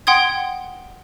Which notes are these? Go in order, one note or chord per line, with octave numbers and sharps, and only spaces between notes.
F#5 G5 C6 D#6 G#6